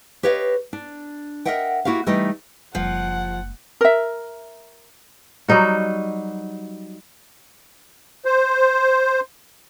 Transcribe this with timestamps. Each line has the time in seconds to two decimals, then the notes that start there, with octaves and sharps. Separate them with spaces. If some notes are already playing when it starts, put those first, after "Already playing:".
0.23 G4 B4 C#5 D#5 F5
0.73 D4
1.45 A#4 B4 D#5 E5 F#5 G5
1.85 A#3 E4 F#4 G4 F5
2.06 E3 G3 A3 D#4 D#5 G5
2.75 F#1 F3 G3 F#5
3.81 A#4 E5
5.48 F#3 G3 D#4 F#4
8.25 C5